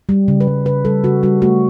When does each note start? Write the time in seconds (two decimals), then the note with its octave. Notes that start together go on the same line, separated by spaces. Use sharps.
0.09 G3
0.28 C#3
0.41 B4
0.47 G3
0.66 C#3 B4
0.85 G3 A4
1.04 C#3 F#4
1.23 G3 F#4
1.42 A3 F#4